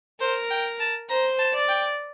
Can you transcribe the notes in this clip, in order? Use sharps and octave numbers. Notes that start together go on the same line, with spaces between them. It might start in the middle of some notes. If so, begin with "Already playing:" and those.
A#4 C5
G5
A5
C5 A#5
A5
D5
G5